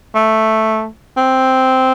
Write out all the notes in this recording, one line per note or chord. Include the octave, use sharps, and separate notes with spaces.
A3
C4